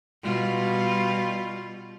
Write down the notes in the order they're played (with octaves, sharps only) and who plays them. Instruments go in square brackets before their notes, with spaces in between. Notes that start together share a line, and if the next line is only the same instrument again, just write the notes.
[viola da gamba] B2 G3 F4